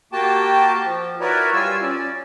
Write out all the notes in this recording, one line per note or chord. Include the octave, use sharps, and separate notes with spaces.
A#3 F#4 G4 G5 A5
F3
E4 F#4 A#4 B4 C#5 D5
G3 F4 G#5 E6
C#4 D5